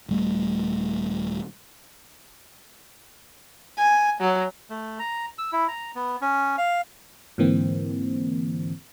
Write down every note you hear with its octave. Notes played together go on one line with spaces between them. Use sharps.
D#1 G3 A3
G#5
F#3
A3
A#5
E6
E4
A#5
B3
C#4
F5
G#2 D3 E3 A#3 C4